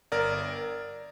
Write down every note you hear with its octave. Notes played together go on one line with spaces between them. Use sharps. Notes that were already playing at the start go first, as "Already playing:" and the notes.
G1 A#4 D5